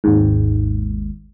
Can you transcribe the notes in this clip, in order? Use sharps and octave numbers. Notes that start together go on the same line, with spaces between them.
G#1 D#2 G#2